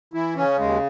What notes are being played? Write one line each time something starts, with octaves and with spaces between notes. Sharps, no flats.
E3 E4
C#3 C#4
D#2 G#3